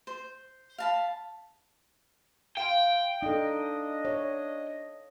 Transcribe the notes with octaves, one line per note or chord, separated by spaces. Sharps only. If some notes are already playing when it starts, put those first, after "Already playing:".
C5
F5 A5 B5
F5 G5 C6
D4 D#4 A4 D#5
C#5